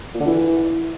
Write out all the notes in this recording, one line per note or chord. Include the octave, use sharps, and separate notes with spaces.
A#2
D3
E3